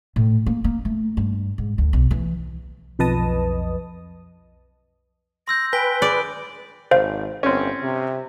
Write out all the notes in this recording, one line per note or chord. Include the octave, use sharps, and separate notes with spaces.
A2
A#3
A#3
A3
G2
G#2
D2
B1
E3
B1 F2 B4 D#5 A5 D#6
C6 E6 G6 A#6
B4 G5 G#5 B6 G7
G#4 D5
G#1 C5 F5
G1 C4 C#4
C3